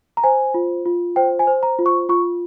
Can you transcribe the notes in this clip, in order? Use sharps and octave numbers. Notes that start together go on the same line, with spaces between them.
A#5
C5 G#5
F4
F4
C5 G5
G#5
C5
A#5
F4
C#6
F4 C#6